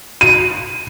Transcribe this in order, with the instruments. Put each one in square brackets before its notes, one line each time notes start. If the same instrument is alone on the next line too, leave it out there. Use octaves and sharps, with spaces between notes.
[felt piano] D#7